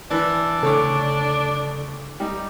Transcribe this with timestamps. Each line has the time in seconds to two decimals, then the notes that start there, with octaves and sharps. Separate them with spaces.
0.11 E3 D4
0.63 D2 C#3 A4 C#5 D6
2.20 G3 D#4